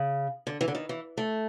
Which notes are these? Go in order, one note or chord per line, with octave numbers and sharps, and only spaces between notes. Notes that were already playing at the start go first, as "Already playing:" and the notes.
Already playing: C#3
D3
E3
D3
D#3
E3
A3